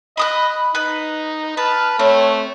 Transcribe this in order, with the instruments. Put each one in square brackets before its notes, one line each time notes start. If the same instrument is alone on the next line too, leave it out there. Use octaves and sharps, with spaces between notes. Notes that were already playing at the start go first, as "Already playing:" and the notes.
[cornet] D#5 [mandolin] B5 D#6 F#6
[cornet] D#4 [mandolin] B4
[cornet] B4 [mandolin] A5 [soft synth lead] F6
[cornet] A3 [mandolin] C4 [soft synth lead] C#5